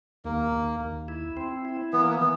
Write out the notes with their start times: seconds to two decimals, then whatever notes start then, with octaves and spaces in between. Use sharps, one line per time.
0.25 D#2 A#3
0.52 D#2
0.80 D#2
1.08 E4
1.37 C4
1.65 E4
1.93 E3 B3
2.01 A#3
2.10 B3
2.20 E3 B3